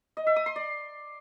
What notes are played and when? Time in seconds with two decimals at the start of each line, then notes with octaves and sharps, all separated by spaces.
0.17 D#5
0.27 E5
0.36 D#6
0.46 C6
0.56 D5